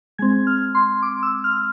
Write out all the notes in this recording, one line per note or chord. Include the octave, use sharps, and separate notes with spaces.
G#3 C4 G#6
F6
C6
D6
E6
F6